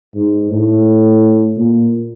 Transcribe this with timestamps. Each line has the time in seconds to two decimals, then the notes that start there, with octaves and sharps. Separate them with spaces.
0.15 G#2
0.50 A2
1.57 A#2